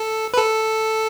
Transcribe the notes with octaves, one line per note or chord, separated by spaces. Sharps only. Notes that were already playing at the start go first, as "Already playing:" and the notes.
Already playing: A4
B4
A4